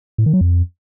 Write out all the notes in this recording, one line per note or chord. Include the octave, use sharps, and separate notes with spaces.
A2
D#3
F#3
F2